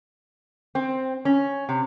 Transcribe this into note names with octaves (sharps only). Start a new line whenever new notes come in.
C4
C#4
C3